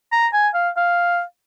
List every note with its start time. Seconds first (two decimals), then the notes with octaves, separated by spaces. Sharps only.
0.12 A#5
0.33 G#5
0.54 F5
0.77 F5